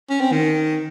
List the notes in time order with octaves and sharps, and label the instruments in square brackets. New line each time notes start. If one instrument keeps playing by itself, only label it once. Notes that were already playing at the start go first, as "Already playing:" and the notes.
[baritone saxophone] C#4
C4
D#3